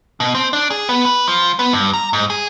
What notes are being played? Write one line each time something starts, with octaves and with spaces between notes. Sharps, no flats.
B2
C4
D4
G#4
B3
B4
F3
B3
G2
A#5
G#2
G#4